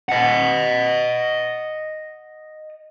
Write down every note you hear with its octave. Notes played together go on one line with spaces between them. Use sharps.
D#5 F#5